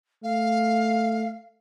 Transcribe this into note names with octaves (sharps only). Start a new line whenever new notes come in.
A3 F5